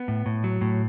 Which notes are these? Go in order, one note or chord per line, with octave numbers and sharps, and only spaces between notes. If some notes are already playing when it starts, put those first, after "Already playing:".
Already playing: B3
A2
A2
F#3
A2